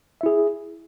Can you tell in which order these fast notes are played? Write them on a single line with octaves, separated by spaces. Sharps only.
E5 E4 G#4